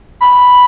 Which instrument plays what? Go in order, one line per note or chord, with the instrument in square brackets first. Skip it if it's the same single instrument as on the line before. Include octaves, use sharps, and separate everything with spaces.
[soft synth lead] B5